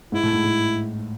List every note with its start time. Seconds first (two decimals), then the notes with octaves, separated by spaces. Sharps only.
0.12 G#2 E4
0.23 A2
0.33 G#2
0.44 A2